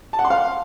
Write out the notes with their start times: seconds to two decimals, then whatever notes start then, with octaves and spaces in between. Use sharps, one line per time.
0.13 A5
0.19 F#5
0.25 C6
0.30 F5